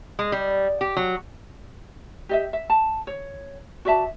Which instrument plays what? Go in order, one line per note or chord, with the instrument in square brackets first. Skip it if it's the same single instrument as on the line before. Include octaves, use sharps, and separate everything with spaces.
[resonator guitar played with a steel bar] G#3
G3
G4
F#3
[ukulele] G4 D#5 E5
E5
A5
C#5
F#4 D5 E5 A5